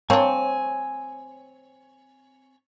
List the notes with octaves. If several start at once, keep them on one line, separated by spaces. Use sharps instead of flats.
A#3 C4 D4 C#5 G#5